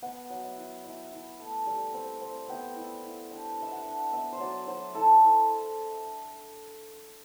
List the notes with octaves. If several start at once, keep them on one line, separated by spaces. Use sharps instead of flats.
B3 F#5
F#3
E5
E4
E4 E5
E4
A3
G3
C4
C4
B3 G5
E4
E4
D4 G5
D4 E5
F#5
D4
B3 E5
C5
F#3 D5
F#3 C5
E4 A4
E4